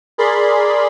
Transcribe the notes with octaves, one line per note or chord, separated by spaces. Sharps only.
G#4 A#4 D5 B5 C6